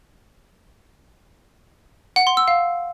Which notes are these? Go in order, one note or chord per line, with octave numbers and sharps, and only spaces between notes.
F#5
C6
E6
F5